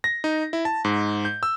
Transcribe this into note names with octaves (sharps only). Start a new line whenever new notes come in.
A#6
D#4
E4
A5
G#2
G6
E6